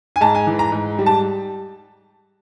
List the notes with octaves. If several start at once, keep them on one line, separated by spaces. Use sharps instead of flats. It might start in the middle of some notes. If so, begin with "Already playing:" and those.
G#5
G#2 A5
G#5
E3
A#5
G#2
G3
A5